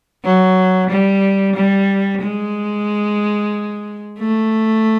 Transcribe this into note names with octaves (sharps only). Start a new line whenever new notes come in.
F#3
G3
G3
G#3
A3